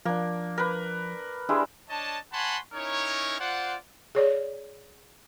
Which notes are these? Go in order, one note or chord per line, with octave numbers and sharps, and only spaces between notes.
F3 A#3 D4
A#4 B4
G3 G#3 D4 E4 G#4
D4 C#5 D#5 A5
C#5 F#5 G#5 A5 B5 C6
C#4 D#4 E4 A#4 C#5
F4 C5 D5 F#5
G#4 C#5 D5